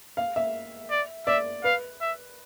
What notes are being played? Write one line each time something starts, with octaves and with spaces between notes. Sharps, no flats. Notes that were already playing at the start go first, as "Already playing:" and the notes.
F5
E5
D5
D5 E5
B4 F5
E5